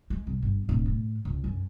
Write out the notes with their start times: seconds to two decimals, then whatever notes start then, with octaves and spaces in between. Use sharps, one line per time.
0.10 G#3
0.27 C2
0.42 G1
0.69 D1
0.86 A2
1.25 C#2
1.44 F#2